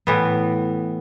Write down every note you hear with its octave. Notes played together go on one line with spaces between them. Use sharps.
A2 E3 B3